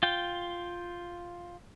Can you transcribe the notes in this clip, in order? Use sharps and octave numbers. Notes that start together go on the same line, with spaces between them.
F4 G5